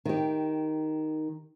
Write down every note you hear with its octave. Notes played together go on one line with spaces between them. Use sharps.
D#3 G4